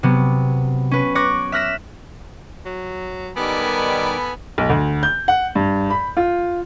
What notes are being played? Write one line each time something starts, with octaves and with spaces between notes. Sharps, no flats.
C3 F#3 B3
C#4 B4
C#5 D6 F#6 A#6
E5 F6 F#6 A#6 B6 E7
F#3
D#3 G3 B3 A4 G#5 B5 D6
B1
D2
G6
F#5
G2
B5
F4